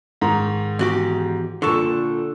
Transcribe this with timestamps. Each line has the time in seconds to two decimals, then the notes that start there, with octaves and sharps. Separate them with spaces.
0.22 G#2 D#3 A#5
0.79 E2 F#4 G4
1.62 A#2 D3 A4 C#6